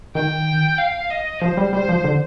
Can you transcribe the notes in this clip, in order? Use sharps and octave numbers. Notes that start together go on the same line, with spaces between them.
D#3 G5
F5
D#5
F3 C5
G3
G3 C5
F3
D3